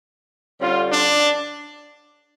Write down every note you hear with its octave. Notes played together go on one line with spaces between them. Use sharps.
D3 G3 C#4 F4
D4